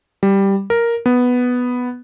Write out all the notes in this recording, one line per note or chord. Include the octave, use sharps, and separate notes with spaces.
G3
A#4
B3